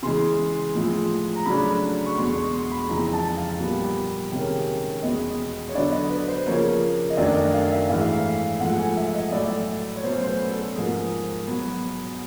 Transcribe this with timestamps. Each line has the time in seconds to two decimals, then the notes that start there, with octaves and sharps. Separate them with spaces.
0.03 C#3 E3 G#3 C6
0.75 A2 F3 G#3
1.35 A#5
1.45 C#3 F#3 A3 D4 B5
2.06 C#6
2.17 E2 B2 G#3 C6
2.36 C#6
2.54 C6
2.71 B5
2.88 F2 C#3 E3 G#3 A#5
3.13 A5
3.37 F5
3.60 A#2 G3 B3
4.32 C3 D#3 G#3 C#4
5.03 E2 B2 G#3 B3 D#5
5.69 C#5
5.75 D3 F#3 B3 D4 D5
5.92 D#5
6.10 B4
6.28 C5
6.47 C#3 F3 A#3 C#5
7.10 D#5
7.17 F#2 D#3 F#3 A3 D4 D5
7.35 D#5
7.54 F5
7.72 E5
7.89 G#2 E3 A3 F5
8.01 E5
8.12 F5
8.60 G#2 F3 A3 F#5
8.79 G#5
8.97 E5
9.09 E5
9.14 D#5
9.31 A2 F#3 A3 D5
9.96 C#5
10.03 B2 F#3 A3 C#4 C5
10.22 C5
10.27 B4
10.51 A4
10.75 G#2 F3 A#3 G#4
11.47 B2 F#3 B3